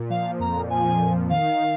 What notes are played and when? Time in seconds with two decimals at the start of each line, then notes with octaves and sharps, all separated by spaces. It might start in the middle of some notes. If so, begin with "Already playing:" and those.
Already playing: A#2
0.10 F3 F5
0.40 F2 A#5
0.70 F3 G#5
1.00 F3
1.30 D#3 F5